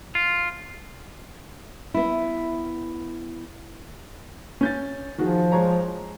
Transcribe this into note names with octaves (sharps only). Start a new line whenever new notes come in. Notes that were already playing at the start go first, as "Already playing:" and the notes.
F4
B3 E4
C#4 G6 A6
D#3 F3 F#4 G#4
G#3 C#5 A#5